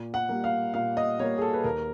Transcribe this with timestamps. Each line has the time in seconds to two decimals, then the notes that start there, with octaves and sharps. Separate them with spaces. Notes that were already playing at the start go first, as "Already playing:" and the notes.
Already playing: A#2
0.14 F#5
0.29 G3 A#3
0.44 F5
0.74 A#2 F5
0.97 D#5
1.19 G3 A#3 C#5
1.38 G#4
1.42 A4
1.53 B4
1.64 D#2 A#4